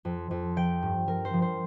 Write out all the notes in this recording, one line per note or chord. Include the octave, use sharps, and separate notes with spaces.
F2
F2
F3 G5
G2
F3 A#4
C5
F3
C5